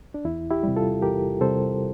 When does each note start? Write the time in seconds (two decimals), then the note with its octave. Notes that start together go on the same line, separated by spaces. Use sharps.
0.14 D4
0.25 E2 E4
0.50 E4 G4
0.63 C3 G3
0.76 F4 A4
1.02 E2 G4 A#4
1.41 C3 G3 A4 C5